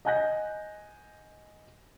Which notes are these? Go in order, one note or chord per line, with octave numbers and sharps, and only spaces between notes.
D#5 F#5 G#5 F#6 G6 A#6